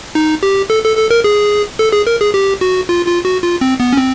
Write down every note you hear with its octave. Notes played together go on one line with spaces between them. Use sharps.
D#4
G4
A4
A4
A4
A#4
G#4
A4
G#4
A#4
G#4
G4
F#4
F4
F4
F#4
F4
C4
B3
C#4
C4